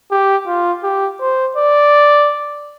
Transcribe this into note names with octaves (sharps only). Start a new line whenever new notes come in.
G4
F4
G4
C5
D5